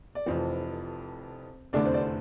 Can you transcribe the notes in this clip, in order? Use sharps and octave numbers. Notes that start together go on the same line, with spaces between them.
D5
F1 F2 E3 C4 C5
F1 E2 D3 A3 D4 D5
C4 C5
D5
C4 C5